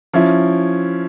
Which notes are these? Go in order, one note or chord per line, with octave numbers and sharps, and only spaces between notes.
F3 C#4 E4